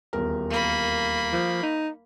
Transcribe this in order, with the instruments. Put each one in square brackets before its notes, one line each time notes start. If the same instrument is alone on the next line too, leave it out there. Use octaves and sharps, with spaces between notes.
[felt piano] D#1 E2 A#4
[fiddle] A#3 B5
[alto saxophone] F3
D#4